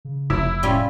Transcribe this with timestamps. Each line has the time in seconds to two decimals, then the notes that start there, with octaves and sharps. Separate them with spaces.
0.05 C#3
0.30 F1 E4
0.63 A2 G3 C#4 F4